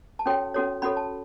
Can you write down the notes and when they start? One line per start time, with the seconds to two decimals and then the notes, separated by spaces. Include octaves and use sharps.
0.19 A5
0.26 C#4 F#4 A4 C#5 G5
0.54 C#4 F#4 A4 C#5
0.82 C#4 F#4 A4 C#5 B5
0.97 A5